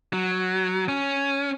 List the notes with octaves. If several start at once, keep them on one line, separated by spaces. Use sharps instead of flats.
F#3
C#4